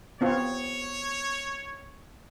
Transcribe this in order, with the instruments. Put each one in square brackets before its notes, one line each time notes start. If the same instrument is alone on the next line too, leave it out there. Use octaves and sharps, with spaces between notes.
[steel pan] B3 C4 F4 [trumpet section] C#5